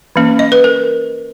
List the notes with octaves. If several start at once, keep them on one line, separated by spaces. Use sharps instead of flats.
E3 A#3 C#4
D#5
B4
A#4